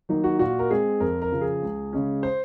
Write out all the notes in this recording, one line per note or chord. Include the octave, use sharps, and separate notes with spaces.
D#3 F#3 A#3 D#4
F#4
A#2 F#4
A#4
G#3 C4 G#4
F2 A#4
A#4
C#3 F3
G#4
C#2
C#3 G#3 C#4
C5